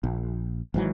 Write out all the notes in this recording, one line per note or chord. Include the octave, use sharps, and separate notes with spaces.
A#1
G#1 G#2 E3 F#3